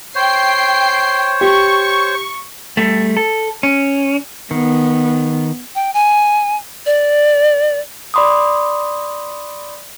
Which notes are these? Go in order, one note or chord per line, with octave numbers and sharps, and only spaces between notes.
C5 C#5 G5 C7
G4 C#6
G3 A3
A4
C#4
D#3 B3
G5
G#5
D5
D5 B5 C6 D6 D#6